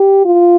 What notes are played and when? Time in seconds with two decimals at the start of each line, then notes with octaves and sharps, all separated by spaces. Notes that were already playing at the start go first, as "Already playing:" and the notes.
Already playing: G4
0.25 F4